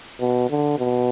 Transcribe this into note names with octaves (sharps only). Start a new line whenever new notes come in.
B2
D3
B2